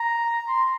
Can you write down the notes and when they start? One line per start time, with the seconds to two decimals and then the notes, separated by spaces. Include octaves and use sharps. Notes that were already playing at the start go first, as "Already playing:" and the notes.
Already playing: A#5
0.48 C6